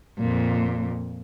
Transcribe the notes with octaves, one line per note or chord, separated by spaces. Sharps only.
F2 A#2